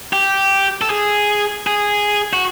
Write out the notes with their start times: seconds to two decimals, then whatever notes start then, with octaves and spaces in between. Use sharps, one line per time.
0.13 G4
0.82 A4
0.90 G#4
1.67 G#4
2.33 F#4